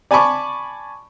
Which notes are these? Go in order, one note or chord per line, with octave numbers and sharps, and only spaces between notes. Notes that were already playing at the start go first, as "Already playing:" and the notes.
D5 G#5 A5 B5 C#6 D6